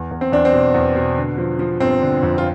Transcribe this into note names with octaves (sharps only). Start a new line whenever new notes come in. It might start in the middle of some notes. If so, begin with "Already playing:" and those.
Already playing: E2
E2
C4
E2 D4
C4
B2
E2
B2
D3
F3
F3
G1 C4
D3
F2
F4